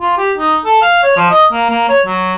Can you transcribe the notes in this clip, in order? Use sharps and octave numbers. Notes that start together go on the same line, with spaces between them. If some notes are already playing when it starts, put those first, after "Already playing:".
F4
G4
D#4
A4
F5
C#5
F3
D#5
A#3
A#3
C#5
F#3